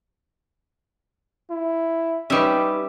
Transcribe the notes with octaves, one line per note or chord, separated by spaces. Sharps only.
E4
G3 C#4 D#4 G4 B4 E5